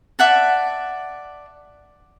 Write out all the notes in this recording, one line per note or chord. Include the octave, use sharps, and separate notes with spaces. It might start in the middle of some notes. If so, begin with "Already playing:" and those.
D5 E5 F#5 A5